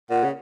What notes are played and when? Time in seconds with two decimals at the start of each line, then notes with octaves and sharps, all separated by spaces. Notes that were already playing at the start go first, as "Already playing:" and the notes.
0.10 A#2 F#5
0.24 C#3